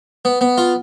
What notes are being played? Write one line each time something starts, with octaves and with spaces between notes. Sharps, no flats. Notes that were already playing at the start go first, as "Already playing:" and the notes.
B3
B3
F4